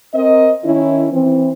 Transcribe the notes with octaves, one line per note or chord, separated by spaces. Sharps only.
C4 A#4 D#5
D#3 C#4 E4
E3 C4